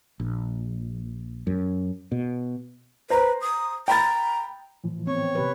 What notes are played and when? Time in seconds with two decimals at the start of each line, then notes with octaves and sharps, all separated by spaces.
0.20 A#1
1.47 F#2
2.12 B2
3.10 B4 C5 A#5
3.41 D#6
3.88 G5 A#5 B5 A6
4.84 A2 E3 F3
5.07 B3 C4 C#5
5.35 C3 G4 B4